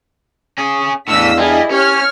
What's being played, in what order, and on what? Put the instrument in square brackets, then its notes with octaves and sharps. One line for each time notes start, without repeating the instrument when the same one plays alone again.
[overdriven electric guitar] C#4 G#4
[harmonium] E2 D4 F5 [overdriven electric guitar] A2 E3 [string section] D#5 E6 B6
[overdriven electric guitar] G3 [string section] E4 G#4 D#5
[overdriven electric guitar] C#4 [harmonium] G4 [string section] C#5 F6